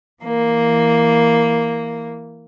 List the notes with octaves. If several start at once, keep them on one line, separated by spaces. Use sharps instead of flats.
E3 A#3